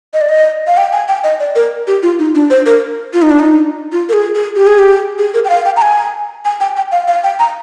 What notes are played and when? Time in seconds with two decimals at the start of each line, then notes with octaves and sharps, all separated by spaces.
0.14 D#5
0.21 D5
0.29 D#5
0.67 F5
0.77 G5
0.92 G#5
1.08 G5
1.24 D#5
1.40 D5
1.55 A#4
1.87 G4
2.03 F4
2.19 D#4
2.35 D4
2.50 C5
2.66 A#4
3.13 F4
3.22 D#4
3.30 D4
3.40 D#4
3.92 F4
4.09 A#4
4.13 G#4
4.35 G#4
4.56 G4
4.67 G#4
4.79 G4
5.18 G#4
5.34 A#4
5.45 G5
5.50 F5
5.65 G5
5.77 A#5
5.82 G#5
6.45 G#5
6.60 G5
6.76 G5
6.92 F5
7.08 F5
7.24 G5
7.39 A#5